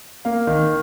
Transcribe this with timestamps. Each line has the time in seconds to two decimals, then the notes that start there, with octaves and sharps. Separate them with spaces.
0.25 A#3 F5
0.47 D#3